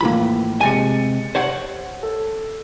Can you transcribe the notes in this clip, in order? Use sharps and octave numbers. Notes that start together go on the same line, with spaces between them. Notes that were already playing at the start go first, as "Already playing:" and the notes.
A2 E3 F3 A#3 B5
C3 G#3 G#5 A6 C#7
G4 C5 C#5 F#5
A4